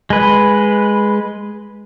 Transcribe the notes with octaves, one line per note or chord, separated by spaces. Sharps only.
G#3 B4